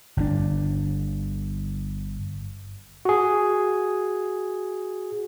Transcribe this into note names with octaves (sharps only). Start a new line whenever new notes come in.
G1 A#2 D4
F#4 G#4